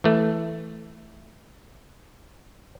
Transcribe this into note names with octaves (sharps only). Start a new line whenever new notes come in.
E3 A3